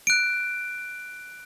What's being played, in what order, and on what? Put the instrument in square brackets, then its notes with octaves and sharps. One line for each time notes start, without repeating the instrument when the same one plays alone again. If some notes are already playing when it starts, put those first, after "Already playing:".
[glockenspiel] F#6 D7